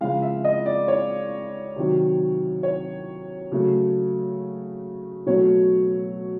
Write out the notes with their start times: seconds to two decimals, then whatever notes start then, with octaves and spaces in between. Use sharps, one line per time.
0.01 C#3 F3 G#3 F5
0.22 E5
0.44 D#5
0.66 D5
0.88 C#5
1.76 C3 D#3 F#3
2.63 C#5
3.52 C#3 F#3 A3
5.26 B2 F#3 A3 C#5